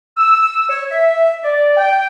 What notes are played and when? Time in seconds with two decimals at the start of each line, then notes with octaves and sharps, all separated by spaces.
0.17 E6
0.69 C#5
0.91 E5
1.44 D5
1.77 G5